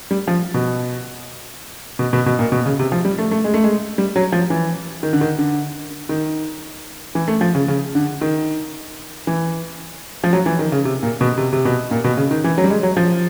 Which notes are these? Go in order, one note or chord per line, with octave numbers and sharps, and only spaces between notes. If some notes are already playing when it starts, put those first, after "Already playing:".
G3
F3
B2
B2
B2
B2
A#2
B2
C#3
C3
F3
G3
A3
A3
G#3
A3
G#3
G3
F#3
F3
E3
D#3
D3
D#3
D3
D#3
E3
A3
F3
C#3
C#3
D3
D#3
E3
F3
F#3
E3
D#3
C#3
C3
A#2
B2
C3
C3
B2
A#2
B2
C#3
D#3
E3
F#3
G3
G#3
F#3
F3